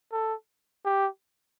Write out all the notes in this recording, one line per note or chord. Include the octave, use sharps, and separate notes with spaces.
A4
G4